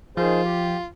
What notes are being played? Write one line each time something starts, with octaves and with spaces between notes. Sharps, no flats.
D#3 F3 F4 G#4 C5
G4